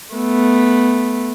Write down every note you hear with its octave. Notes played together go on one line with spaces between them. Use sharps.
A3 B3